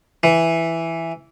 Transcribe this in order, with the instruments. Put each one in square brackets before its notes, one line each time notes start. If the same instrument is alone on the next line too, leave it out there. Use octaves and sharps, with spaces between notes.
[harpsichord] E3